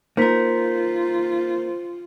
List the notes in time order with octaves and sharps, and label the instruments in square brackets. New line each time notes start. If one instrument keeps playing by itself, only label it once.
[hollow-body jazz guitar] A#3 A#4 [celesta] D#4 B6 [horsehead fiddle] F4 [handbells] C5